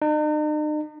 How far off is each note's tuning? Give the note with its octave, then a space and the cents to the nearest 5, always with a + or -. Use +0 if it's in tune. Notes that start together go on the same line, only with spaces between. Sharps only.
D#4 -45